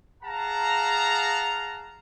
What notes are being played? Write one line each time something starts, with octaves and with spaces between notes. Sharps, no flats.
G#4 F5 F#5 A5 A#5